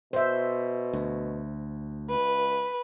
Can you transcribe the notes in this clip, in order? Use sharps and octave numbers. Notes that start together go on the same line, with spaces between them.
B2 C5 E5
D2
C#2 B4